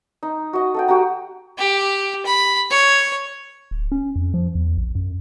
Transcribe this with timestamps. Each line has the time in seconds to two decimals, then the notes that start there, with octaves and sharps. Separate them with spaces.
0.23 D#4
0.53 F#4 D#5
0.74 A4 F#5 G5
0.88 F#4 G4 G5 A#5
1.58 G4
2.26 B5
2.71 C#5
3.71 D1
3.92 C#4
4.16 F2
4.34 F3
4.55 E2
4.78 A#1
4.95 F#2